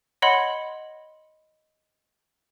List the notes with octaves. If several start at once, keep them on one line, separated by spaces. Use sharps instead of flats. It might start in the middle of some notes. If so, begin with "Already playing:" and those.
C#5 D#5 F#5 B5 C6